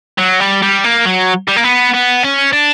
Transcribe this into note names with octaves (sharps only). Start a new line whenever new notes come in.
F#3
G3
G3
A#3
F#3
G3
A#3
B3
B3
C#4
D4